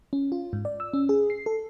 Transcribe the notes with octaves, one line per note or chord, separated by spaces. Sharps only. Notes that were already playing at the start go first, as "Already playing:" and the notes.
C#4
F4
G#2
D5
E6
C#4
G#4
C7
A4